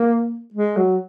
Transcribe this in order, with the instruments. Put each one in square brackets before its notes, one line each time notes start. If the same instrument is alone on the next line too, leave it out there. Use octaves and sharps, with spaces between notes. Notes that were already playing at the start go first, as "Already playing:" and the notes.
Already playing: [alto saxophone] A#3
G#3
F#3